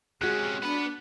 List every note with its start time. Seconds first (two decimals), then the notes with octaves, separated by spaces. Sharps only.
0.21 C3 G#3 C#4 F#4 G#4 F#6
0.63 B3 D4 B4